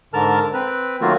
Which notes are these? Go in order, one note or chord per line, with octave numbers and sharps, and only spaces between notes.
G#2 D3 A#4 A5 F6
C4 B4
D#3 F#3 A3 A#3 F4 F#4